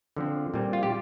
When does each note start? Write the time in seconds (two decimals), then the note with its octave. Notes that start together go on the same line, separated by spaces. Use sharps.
0.17 D3 F3 C4
0.54 A#2 G3 C4
0.73 F4
0.83 G4